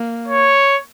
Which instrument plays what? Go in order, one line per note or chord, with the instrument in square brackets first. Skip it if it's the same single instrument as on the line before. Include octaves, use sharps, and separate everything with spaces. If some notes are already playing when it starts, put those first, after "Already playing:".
Already playing: [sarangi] A#3
[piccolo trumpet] C#5